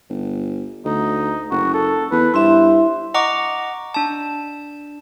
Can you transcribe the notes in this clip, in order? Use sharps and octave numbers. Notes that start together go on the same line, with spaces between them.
G1
D2 D#4
F#1 F#4
A4
E2 B4
G2 E4 C5 E5
D#5 F#5 A#5 C#6 D6
D4 A5